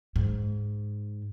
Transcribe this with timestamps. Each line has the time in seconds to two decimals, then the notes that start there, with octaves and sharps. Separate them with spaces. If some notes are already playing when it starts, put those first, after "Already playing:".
0.16 G#2